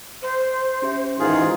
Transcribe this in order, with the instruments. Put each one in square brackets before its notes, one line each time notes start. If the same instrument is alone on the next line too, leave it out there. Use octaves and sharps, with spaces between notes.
[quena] C5
[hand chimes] C#4 G4 E5
[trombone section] G#2 D#3 E3 [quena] D#4 [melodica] F4 G#4